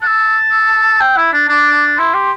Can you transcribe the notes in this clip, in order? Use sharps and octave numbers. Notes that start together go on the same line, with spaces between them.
A5 F#6
E6
E6
G5
E4
D4
D4 D6
E4 C6
G4